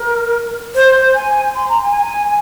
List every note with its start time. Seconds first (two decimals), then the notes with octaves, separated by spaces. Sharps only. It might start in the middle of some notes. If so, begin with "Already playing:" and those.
Already playing: A#4
0.75 C5
1.14 G#5
1.55 C6
1.69 A#5
1.82 G#5